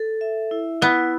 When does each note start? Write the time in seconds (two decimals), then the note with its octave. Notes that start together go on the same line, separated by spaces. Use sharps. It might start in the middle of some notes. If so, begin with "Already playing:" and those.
Already playing: A4
0.21 E5
0.51 E4
0.82 B3 E4